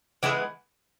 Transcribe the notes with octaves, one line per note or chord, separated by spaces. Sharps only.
E3 G#3 B3 E4